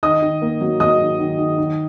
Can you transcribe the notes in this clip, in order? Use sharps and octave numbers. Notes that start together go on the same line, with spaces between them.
D#3 D#5 D#6
D#3
A#3
F#3
F#3 D#5 D#6
D#3
D#3
D#3
D#3